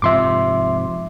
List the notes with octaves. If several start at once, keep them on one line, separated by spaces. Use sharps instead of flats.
G#2 C3 F3 E5 C6 D6